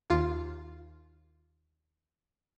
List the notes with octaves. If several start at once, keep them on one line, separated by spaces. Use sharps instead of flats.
D#2 F4